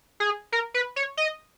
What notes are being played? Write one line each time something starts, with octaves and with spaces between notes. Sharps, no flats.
G#4
A#4
B4
C#5
D#5